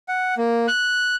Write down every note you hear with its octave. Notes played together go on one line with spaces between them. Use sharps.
F#5
A#3
F#6